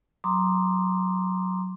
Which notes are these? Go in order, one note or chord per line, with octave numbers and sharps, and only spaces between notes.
F#3 A#5 C6 D6 D#6